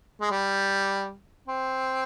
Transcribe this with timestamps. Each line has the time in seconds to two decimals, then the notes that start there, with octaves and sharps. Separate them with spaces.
0.21 G#3
0.31 G3
1.48 C4